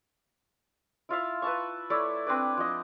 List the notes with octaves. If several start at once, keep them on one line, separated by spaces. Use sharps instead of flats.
E4 F4 E5 F5
B4 E5 A5 C#6
A3 E4 C#5 D5
C4 D4 B4 D5
F3 D#5